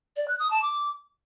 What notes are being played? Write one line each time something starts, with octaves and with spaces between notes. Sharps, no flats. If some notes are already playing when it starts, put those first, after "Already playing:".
D5
F#6
D#6
A5
D6